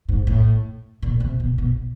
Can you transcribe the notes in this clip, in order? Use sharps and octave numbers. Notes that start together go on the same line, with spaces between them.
G#2
A2
A#2
C3
B2
B2